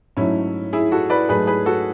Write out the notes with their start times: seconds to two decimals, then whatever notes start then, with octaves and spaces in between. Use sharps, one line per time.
0.17 G#2 F#3 A3 C#4 E4
0.73 E4 G#4
0.92 F#4 A4
1.10 B4 D5
1.29 G#2 F#3 A3 G#4 B4
1.47 G#4 B4
1.66 F#4 A4